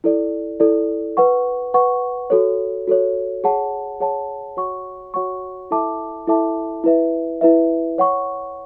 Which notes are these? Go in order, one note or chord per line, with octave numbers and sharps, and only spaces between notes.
E4 A4 D5
E4 A4 D5
B4 F#5 C#6
B4 F#5 C#6
F#4 A4 C#5
F#4 A4 C#5
G#4 C#5 F#5 A5
G#4 C#5 F#5 A5
F#4 C#5 F#5 C#6
F#4 C#5 F#5 C#6
E4 A4 E5 A5 D6
E4 A4 E5 A5 D6
E4 B4 E5
E4 B4 E5
C#5 F#5 C#6